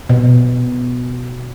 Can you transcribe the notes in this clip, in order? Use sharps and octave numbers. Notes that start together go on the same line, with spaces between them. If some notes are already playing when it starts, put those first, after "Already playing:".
B2